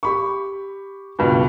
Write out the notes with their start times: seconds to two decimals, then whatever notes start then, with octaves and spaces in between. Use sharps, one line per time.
0.03 G4 B5 C#6
1.19 C#2 G2 B2